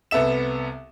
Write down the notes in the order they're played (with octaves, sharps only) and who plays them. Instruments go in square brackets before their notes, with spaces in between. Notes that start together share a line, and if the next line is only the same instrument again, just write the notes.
[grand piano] C2 B3 A4 E5 E7